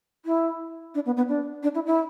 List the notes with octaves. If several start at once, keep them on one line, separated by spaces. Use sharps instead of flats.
E4
D4
B3
B3
D4
D4
E4
E4